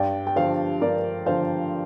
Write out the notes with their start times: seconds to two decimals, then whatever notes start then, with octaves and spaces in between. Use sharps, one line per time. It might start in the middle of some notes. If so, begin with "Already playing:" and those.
Already playing: G2 D5 G5
0.27 G5
0.36 D3 F3 C5 F5
0.81 G2 A#4 D5
1.26 D3 F3 C5 F5